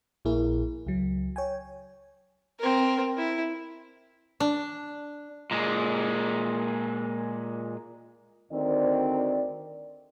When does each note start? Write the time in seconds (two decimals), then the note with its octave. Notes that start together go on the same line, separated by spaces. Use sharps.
0.25 A#1 A#2 E4 G#4 A#4
0.87 C#2 F#3
1.36 C#5 G5 G#5
2.60 C4 A#4
3.17 E4
4.40 D4
5.51 A#2 G#3
8.52 D2 D#3 C4 D5